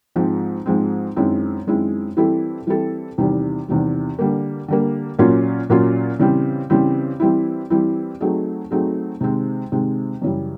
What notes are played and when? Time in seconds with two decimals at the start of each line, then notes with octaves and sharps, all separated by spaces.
0.16 G#2 F3 G#3 C4
0.66 G#2 F3 G#3 C4
1.16 F#2 D#3 G#3 C4 E4
1.67 F#2 D#3 G#3 C4 E4
2.17 E3 G3 C4 E4 A4
2.67 E3 G3 C4 E4 A4
3.18 E2 C3 D#3 G3
3.68 E2 C3 D#3 G3
4.19 D3 G3 A#3
4.68 D3 G3 A#3
5.19 A#2 F#3 A#3 C#4 F4
5.69 A#2 F#3 A#3 C#4 F4
6.19 C#3 E3 G3 C4
6.70 C#3 E3 G3 C4
7.20 E3 G3 C4 E4
7.70 E3 G3 C4 E4
8.20 F#3 A3 C4 D#4 G#4
8.71 F#3 A3 C4 D#4 G#4
9.21 C3 D#3 G#3 C4
9.72 C3 D#3 G#3 C4
10.22 F#2 C#3 E3 G3